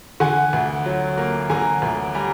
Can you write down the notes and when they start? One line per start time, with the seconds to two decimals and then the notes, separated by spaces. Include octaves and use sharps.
0.20 D3 F#5 G#5
0.53 D2
0.86 F#3
1.18 A#3
1.50 D3 G#5 A#5
1.82 D2
2.15 G3 G#5 A#5